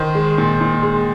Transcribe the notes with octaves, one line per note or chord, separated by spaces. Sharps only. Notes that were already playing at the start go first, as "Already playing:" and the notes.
Already playing: D#3 C5
G#3
A#2
A#2
G#3